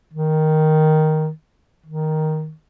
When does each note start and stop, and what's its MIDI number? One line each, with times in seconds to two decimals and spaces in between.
0.13 1.29 51
1.86 2.52 51